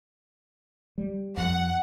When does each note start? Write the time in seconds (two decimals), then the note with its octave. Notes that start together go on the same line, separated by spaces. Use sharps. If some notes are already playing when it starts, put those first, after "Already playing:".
0.98 G3
1.37 F2 F#5